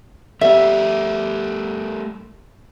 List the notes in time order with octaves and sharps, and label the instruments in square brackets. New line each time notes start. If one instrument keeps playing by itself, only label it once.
[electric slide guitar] G3 A3 G4 [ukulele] E5